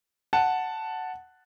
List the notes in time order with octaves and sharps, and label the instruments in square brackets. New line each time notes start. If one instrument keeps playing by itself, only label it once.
[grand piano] F#5 A5